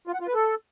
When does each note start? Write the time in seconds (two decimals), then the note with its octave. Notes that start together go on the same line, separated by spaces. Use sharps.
0.07 F4
0.14 F#5
0.21 F4
0.27 B4
0.34 A4